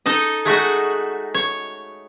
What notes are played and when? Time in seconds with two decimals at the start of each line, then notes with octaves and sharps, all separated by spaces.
0.06 D#4 A4 D#5
0.45 G#3 A3 D#4 F#4
1.34 C#5